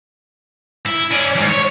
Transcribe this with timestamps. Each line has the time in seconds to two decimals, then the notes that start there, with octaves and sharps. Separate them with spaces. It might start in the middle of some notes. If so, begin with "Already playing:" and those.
0.86 E4
1.11 C#4 D5
1.35 F2 G#2
1.49 C#5